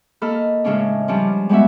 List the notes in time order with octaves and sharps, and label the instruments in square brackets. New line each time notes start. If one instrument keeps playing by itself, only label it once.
[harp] A#3 A4 D#5 B5 F6
A2 C#3 G#3 C#4 D4
F3 G3 C#4 D4
G3 G#3 B3 F#4 E5